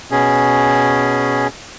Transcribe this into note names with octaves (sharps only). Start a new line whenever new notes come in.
B2 C#4 G#4